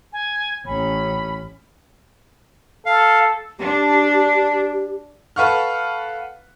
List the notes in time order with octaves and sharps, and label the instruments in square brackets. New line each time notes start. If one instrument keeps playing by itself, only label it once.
[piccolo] G#5
[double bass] A1 C#4 [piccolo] B5
[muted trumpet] A4 [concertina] F5
[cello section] D4 [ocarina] G4
[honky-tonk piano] A4 B4 F5 F#5 C#6 F6